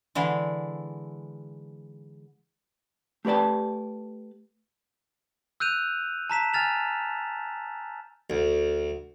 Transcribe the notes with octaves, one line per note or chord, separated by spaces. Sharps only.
D3 E3 G#3
A3 G4 B4 D5 A5
E6 F#6 G6 D#7 F7
A5 A#5 B6 E7
G#5 F6 A6 F7
D2